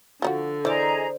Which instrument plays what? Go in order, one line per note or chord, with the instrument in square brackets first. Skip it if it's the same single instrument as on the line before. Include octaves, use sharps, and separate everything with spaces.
[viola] D3 [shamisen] F3 D#4 F#4
[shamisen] E3 [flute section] G#4 D#5 A#5 [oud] C5 D5